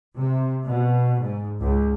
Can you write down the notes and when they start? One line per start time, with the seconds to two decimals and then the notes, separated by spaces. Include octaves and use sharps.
0.16 C3
0.68 B2
1.21 G#2
1.60 C#2